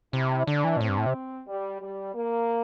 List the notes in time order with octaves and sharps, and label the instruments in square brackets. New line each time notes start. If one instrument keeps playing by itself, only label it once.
[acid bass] C3 [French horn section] E4
[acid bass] D3 [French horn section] D4
[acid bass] E3
A#2
[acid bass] A2 [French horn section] C4
[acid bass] G2
A2
C3
[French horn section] G3
G3
A#3